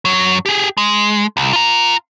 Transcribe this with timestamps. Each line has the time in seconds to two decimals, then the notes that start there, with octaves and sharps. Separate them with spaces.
0.05 F#2 F#3
0.46 G4 G#4
0.77 G#3
1.37 C2
1.53 F4 A#5